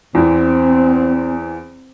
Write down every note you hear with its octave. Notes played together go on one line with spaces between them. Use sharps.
E2 E3 C4